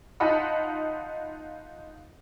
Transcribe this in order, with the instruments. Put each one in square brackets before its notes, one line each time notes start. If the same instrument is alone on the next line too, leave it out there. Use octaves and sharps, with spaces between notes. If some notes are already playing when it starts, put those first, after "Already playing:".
[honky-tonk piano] D#4 F4 D#5 F#5 A5 B5